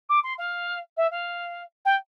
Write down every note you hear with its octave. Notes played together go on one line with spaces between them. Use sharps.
D6
C6
F5
E5
F5
G5